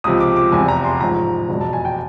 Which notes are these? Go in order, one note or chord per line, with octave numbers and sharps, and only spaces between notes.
C#2 C3 F3 D#6
D6
D6
F1 E2 C3 E3 G#5
A#5
C6
A1 G#2 F3 A#5
F1 E2 B2
A5
G#5
G5